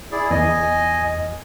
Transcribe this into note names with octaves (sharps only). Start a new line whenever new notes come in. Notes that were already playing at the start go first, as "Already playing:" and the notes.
E4 G#4 D5
E2 D#5 G#5